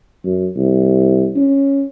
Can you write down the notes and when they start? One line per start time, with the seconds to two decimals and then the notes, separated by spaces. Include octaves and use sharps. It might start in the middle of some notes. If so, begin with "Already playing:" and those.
0.25 F#2
0.56 C2
1.36 C#4